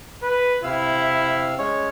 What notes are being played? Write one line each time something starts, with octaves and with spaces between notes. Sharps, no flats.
B4
C3 E4 F5 E6
G#3 C#4 C#5